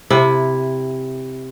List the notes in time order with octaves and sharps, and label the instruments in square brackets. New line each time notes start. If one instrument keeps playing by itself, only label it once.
[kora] C3 E4